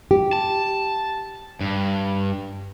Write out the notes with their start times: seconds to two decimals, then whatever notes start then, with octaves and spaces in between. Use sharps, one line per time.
0.11 G4
0.33 A5
1.61 G2